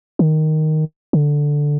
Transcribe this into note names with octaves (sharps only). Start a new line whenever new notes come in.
D#3
D3